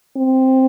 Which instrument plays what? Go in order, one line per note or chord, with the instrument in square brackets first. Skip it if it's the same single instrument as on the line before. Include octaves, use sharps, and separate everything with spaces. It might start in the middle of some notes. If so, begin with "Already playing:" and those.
[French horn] C4